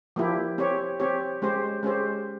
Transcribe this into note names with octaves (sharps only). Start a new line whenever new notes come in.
F3 A#3 E4 G4
C4 G4 C#5
C4 G4 C#5
G#3 C#4 G4 C5
G#3 C#4 G4 C5